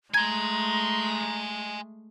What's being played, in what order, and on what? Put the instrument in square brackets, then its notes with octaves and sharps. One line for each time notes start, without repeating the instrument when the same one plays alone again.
[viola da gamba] G#3 A3 [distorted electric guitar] G#5 C6 [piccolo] A#5 [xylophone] G#6